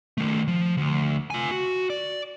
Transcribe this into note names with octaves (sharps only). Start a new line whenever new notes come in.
D#3 A3
F3
D2
F4 G#5
F#4
D5